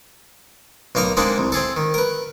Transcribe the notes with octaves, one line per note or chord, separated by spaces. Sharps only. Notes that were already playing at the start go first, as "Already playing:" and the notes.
B1 A#3 D#4 A#4 A#5
G#3 A#3 C4 D4 D#4 G#4
C2
C4 G#4 A4
D#3
A#4 B4